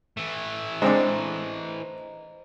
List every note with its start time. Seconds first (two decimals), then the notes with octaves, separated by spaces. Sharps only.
0.17 E3 A3
0.82 G#3 C4 D4 C5 D#5 A#5